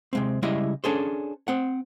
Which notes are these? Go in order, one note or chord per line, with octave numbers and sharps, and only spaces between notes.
C3 G#3 C4
C#3 G3 G#3 E4 D#5 E5
C#4 D4 G#4 A4 C5
C4 F#5